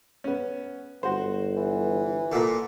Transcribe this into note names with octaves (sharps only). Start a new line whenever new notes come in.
B3 C#4
G1 F#4 C5
E3
A#2 D3